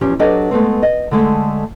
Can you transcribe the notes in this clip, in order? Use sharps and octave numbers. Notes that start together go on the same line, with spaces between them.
E2 F3 C#4 G4
F#3 D4 G4 A4 B4 D#5
G#3 A3 B3 C4
D#5
D3 G#3 A3